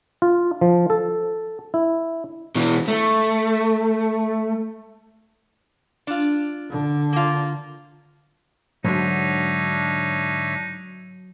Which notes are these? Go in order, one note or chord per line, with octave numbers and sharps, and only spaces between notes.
F4
F3
A4
E4
B2 E3
A3
D4 F4
D3
A#3 F4
G#2 D3 F#3 D4 D#4 C#5 E5